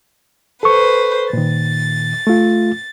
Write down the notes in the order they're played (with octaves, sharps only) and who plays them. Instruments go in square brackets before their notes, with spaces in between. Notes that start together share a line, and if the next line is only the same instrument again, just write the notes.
[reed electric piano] A4 C#6 [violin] B4 C5
[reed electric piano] A#2 D#3 [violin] A6
[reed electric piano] A3 F4